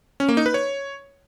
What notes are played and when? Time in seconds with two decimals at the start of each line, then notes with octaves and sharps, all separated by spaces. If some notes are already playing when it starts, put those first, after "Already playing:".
0.20 C#4
0.29 A#3
0.37 D#4
0.46 B4
0.54 C#5